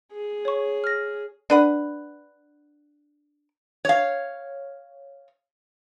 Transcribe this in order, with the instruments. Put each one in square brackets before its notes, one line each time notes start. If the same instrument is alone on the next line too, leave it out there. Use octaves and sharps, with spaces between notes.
[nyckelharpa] G#4
[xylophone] C#5 C#6
F6 A#6
[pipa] D4 B4 F#5
[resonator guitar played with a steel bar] C#5 F5